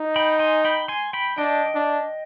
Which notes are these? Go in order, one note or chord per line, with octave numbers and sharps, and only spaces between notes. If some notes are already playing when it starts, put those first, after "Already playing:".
Already playing: D#4
G5 B5
G#5 C6
G5 B5
G#5 C6
G5 B5
D4 D#5 G5
D4